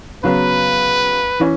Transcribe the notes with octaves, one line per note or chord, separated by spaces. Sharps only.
C#3 F#3 B3 B4
E3 C#4